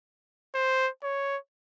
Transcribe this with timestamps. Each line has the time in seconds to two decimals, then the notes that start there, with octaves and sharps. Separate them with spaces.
0.55 C5
1.03 C#5